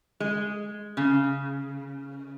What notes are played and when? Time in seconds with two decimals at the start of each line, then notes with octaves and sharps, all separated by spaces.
0.20 G#3
0.97 C#3